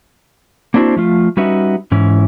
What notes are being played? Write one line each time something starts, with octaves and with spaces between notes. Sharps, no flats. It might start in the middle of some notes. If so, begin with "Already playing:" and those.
A#3 C4 D4 E4 F#4 C5
F3 A3 F4
G3 C#4 D#4 F#4 B4 E5
G#2 E3 C#4 E4